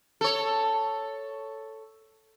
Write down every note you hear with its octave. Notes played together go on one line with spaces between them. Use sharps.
A4 C#5